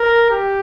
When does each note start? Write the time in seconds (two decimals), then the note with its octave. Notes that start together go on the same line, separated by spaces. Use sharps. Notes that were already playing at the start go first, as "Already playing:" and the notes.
Already playing: A#4
0.31 G4